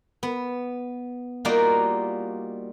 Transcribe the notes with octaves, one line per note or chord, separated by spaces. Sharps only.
B3
G3 A#3 D#4 F4 F#4 D5